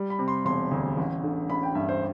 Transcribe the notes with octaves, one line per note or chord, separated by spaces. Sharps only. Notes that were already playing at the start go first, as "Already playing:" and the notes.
Already playing: G3
B5
C3
C6
E1 C6
D2
A1
D3
A1 B5
G5
G2 E5
C5